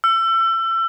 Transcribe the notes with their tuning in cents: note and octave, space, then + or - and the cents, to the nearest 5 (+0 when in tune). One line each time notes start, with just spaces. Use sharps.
E6 +30